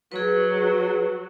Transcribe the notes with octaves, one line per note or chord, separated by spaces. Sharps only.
F#3 G#4 B4